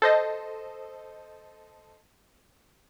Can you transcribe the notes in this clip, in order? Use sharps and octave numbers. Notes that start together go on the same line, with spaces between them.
A4 C5 D#5